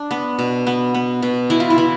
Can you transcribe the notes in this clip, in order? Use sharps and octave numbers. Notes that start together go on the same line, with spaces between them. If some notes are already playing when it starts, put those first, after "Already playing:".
Already playing: D4
B3
B2
B3
B3
B2
E3 E4
F4
E4
E3